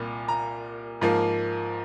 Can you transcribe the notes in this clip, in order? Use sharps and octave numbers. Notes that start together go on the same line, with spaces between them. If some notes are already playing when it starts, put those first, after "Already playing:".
Already playing: C2 A#2 G3 A#3
A#5
G#2 F3 A#3